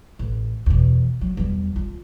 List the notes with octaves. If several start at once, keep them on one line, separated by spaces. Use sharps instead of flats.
A1
E2 B2
F#3
E2 G3
F4